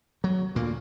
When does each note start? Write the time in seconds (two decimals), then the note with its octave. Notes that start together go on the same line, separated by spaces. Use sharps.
0.24 F#3
0.55 D2 A#2 A#3